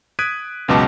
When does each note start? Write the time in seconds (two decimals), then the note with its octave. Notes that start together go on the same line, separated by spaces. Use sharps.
0.19 D#6 F#6 G#6 B6 D7 D#7
0.68 C#2 F#2 B2 D#5 A5 D6